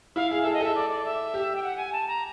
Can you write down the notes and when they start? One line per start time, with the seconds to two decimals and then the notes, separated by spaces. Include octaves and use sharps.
0.16 E4 F5
0.31 G#4 F5
0.41 A4 E5
0.53 D#5
0.61 A4 E5
0.75 D5
0.89 D5
1.04 E5
1.34 G4
1.56 G5
1.63 F#5
1.77 G#5
1.92 A5
2.07 A#5